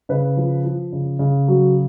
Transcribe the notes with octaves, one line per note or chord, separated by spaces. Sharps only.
C#3 B4
F3
F3
C#3
C#3
F#3